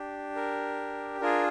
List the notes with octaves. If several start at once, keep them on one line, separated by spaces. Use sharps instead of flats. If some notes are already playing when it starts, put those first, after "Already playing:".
Already playing: D4 G4
A#4
D4 F4 G#4 A#4